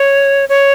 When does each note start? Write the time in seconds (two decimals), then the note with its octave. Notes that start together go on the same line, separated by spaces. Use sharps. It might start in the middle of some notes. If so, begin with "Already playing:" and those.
Already playing: C#5
0.49 C#5